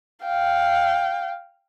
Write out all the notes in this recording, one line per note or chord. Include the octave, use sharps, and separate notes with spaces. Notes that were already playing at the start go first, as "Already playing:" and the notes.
F5 G5